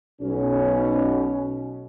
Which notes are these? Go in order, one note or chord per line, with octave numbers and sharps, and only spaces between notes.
B1 B2 C#4